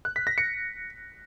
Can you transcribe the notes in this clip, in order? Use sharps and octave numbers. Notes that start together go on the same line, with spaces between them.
F#6
B6
A#6
C#7